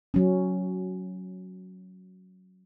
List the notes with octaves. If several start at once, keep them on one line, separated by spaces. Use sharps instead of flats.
F#3 C#4